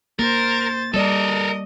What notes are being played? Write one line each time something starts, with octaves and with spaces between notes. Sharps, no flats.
A#3 A#4 C5 A6
G3 A4 A#4 D5 D#5